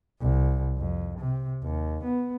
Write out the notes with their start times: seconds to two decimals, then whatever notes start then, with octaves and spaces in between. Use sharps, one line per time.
0.20 C2
0.77 F2
1.19 C3
1.62 D#2
2.04 B3